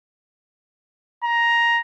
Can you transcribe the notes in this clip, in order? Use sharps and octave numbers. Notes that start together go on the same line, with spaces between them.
A#5